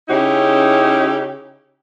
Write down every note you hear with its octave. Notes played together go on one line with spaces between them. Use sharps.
C#3 C#4 D#4 E4 G4